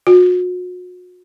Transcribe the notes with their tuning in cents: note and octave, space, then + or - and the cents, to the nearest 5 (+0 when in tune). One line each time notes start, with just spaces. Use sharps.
F#4 -40